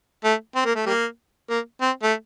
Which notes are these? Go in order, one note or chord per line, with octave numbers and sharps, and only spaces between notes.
A3
C4
A#3
A3
G3 A#3
A#3
C4
A3